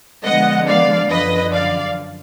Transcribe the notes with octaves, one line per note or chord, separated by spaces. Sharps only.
D3 F3 G#3 B3 D#5 F#5
D5 F5
F#2 D3 F3 B4 D#5
D5 F5